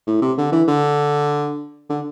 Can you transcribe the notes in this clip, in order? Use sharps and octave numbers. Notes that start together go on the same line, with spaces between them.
A2
C3
D3
E3
D3
D3